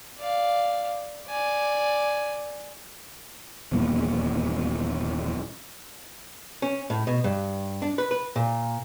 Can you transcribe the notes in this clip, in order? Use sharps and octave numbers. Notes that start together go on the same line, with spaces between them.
D5 F5
D5 G#5
D#1 E2 G2 A#3
C#4
A2
B2
G2
D4
B4
B4
A#2